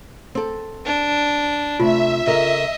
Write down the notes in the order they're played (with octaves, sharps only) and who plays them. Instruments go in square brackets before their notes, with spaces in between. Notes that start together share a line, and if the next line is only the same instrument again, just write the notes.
[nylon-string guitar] C4 A4
[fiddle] D4
[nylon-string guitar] C3 A3 [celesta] F4 [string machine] E5
[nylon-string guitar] C#3 A4 A#4 [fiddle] D#5